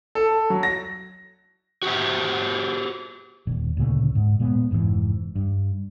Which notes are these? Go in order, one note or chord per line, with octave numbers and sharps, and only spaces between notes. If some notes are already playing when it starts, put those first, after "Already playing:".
A4
F#3
A#6
F#4 G4 C5 E5
D#1
D2 A#2 C#3 A3
G#2
A#2 G#3 A3 B3
F1 G#2 B2 E3
G2